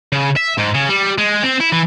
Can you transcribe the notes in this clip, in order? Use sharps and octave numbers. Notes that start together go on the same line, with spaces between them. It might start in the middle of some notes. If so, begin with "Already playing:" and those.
C#3
E5
G#2
C#3
G3
G#3
C4
E4
E3